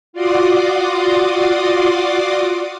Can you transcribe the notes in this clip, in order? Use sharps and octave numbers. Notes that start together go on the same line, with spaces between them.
F4 F#4 D5 C6 D6 D#6